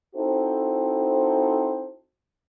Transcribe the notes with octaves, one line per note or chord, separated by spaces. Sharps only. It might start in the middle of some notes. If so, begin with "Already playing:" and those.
C4 D#4 E4 F#4 A4 C5